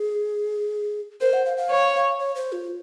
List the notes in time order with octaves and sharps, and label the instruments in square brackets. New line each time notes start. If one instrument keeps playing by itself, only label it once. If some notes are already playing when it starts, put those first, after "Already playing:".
Already playing: [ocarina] G#4
[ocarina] A#4 [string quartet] C5
[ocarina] F#5
F5
F5
[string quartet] C#5
[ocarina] C#5
C5
F4